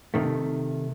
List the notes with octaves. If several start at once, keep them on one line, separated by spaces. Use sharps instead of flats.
C3 D#3 A3